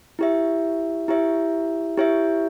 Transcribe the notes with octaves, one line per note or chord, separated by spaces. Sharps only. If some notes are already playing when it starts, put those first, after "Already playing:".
E4 G4 C#5 E5
E4 G4 C#5 E5
E4 G4 C#5 E5